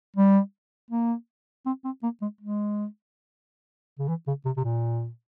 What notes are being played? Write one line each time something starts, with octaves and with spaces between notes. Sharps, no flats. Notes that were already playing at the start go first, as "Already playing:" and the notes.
G3
A#3
C4
C4
A#3
G#3
G#3
C#3
E3
C#3
C3
C3
A#2